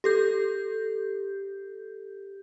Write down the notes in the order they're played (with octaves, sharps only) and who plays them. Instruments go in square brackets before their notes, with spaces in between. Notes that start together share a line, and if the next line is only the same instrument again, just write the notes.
[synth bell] G4 A4 G6